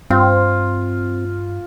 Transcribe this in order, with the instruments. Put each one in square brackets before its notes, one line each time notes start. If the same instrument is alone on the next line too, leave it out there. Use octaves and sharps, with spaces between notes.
[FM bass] G2 [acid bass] C4 [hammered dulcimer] F4